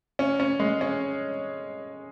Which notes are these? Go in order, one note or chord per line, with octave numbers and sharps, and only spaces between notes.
C#4
C#4
G#3
C#4